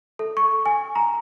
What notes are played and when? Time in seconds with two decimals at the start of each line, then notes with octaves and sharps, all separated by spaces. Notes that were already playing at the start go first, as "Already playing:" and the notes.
0.19 A4
0.37 C#6
0.66 G#5
0.95 A#5